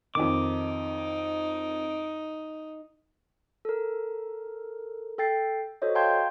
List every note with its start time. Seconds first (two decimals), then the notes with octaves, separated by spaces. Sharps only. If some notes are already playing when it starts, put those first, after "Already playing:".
0.15 F2 D#3 D#4 D6
3.65 A4 A#4
5.18 A4 G5 A6 C7
5.82 F#4 A4 C5 C#5 D#5
5.95 F5 G5 A5 C6 G6 G#6